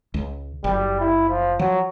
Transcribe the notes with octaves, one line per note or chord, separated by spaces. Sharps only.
C#2
F#1 G3
E4
F3
F3 F#3